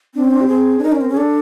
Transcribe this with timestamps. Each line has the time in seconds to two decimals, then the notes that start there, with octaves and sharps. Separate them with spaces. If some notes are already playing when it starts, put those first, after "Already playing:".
0.15 C4 D4
0.23 C#4
0.32 D4
0.41 G4
0.48 C4 G#4
0.79 D4
0.83 D#4 A#4
0.92 C#4
1.01 C4
1.09 C#4
1.12 G#4
1.17 D4 A4